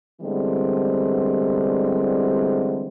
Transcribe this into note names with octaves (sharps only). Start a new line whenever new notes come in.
D3 E3 G3 G#3 B3 C4